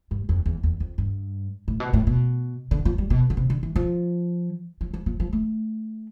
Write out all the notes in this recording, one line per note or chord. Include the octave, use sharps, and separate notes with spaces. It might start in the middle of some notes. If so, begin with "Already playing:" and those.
G2
F2
E2
E2
F2
G2
A2
B2
A2
B2
D3
F3
G3
B2
D3
C3
D3
E3
F3
F3
F3
F3
F3
A3